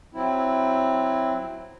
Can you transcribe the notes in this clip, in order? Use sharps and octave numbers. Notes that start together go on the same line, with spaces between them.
F#3 C4 E4